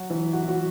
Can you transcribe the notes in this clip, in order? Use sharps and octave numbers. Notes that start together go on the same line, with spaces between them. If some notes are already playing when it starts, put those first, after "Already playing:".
Already playing: F#3 F#4
E3 E4
F#4
E4
F#3 F#4